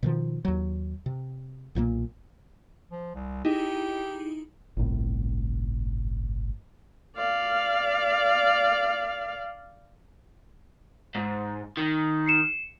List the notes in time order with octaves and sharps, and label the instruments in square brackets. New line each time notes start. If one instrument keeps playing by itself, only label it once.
[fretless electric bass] B2 D#3 F3
D#2 F#3
C3
B1 A#2 F#3 A#3
[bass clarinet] F3
C2
[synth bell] D#4 E4 G#4 [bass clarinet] G4
[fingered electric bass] G1 C2 A2 C3
[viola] D5 F5
[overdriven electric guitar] G#2
D#3
[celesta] C7 C#7 E7